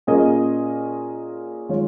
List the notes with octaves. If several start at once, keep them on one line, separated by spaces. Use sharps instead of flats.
A#2 A#3 C#4 G#4 D#5
D#3 G#3 F4 C#5